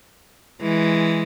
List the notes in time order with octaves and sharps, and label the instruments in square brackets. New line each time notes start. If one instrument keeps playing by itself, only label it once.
[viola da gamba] E3 G#3